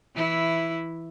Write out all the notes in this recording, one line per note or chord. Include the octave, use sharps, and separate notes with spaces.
E3 E4